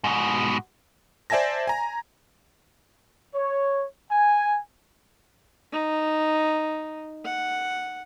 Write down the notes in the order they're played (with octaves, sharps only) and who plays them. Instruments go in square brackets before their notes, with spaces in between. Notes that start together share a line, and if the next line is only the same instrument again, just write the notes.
[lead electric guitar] G#2 B2
[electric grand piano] C5 D5 E5 G#5 A5 A#6
G#5 A#5
[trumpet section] C#5
G#5
[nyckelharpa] D#4
F#5